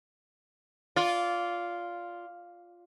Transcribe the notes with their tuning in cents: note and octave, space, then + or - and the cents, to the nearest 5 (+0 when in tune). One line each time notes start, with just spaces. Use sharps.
F4 +0 D5 -20